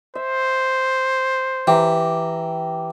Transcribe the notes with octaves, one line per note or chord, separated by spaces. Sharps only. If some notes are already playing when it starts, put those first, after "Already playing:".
C5 E5
E3 G4 A#5